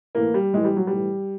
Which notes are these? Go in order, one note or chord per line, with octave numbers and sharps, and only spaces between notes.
A2 E3 A#3
G3
A2 E3 G#3
G3
F#3
G3
A2 E3